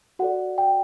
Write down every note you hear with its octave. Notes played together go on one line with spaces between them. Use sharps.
F#4 A4 D5 F#5
G5